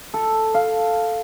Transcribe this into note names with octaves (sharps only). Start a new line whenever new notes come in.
A4
F5